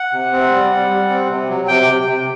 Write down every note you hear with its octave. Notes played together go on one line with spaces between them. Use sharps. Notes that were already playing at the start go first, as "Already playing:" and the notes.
Already playing: F#5
C3
C4
G3
G3
G3
C4
C3
F#3
C3 G5
C3
C3